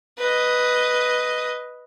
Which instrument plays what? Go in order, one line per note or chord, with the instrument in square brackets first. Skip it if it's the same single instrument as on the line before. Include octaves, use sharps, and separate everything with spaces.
[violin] B4 D#5